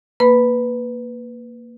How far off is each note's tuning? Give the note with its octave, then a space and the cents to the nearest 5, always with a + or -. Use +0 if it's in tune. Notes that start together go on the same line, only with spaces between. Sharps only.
A#3 +0 B4 +0 B5 +0